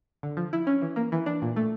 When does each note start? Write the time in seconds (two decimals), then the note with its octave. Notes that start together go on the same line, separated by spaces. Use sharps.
0.23 D3
0.37 F3
0.53 E4
0.67 C#4
0.82 E3
0.96 A#3
1.12 E3
1.26 D4
1.42 A#2
1.56 A3